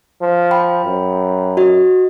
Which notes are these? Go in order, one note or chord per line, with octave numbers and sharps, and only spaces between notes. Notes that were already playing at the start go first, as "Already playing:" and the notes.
F3
G5 B5
F#2
F#4 D#5